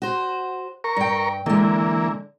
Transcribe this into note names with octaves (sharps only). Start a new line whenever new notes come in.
F#4 C5
A#4 C#6
G2 G5
D3 E3 G#3 A#3